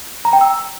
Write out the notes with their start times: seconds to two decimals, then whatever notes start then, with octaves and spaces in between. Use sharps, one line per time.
0.25 A#5
0.33 G5
0.41 E6